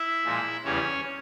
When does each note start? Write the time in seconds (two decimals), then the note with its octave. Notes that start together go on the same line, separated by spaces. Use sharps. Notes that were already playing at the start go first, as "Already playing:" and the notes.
Already playing: E4 E5
0.25 A#2 F3 G#3
0.65 E2 C#3 E3 G3 C#4 C#5